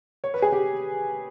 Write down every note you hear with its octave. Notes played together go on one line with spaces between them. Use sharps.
C#5
B4
G#4
G4